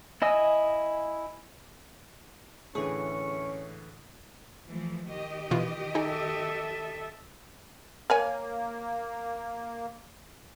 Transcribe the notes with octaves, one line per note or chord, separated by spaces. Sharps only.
E4 D#5 G#5 D#6 E6
A2 D3 E3 C#4 G#4 C#6
E3 F3 A3
D#3 G4 D#5
B2 E3 F4
D#4 G#4 A4 E5 G5
A#3 A#4 C#5 G#5